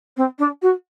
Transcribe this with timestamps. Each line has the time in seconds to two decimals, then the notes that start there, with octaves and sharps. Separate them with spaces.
0.16 C4
0.38 D4
0.62 F#4